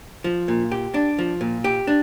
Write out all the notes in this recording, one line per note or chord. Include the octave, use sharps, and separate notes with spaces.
F3
A#2
G4
D4
F3
A#2
G4
D4